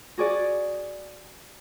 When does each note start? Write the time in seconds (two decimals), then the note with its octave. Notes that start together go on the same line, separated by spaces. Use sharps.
0.18 F#4 G#4 D5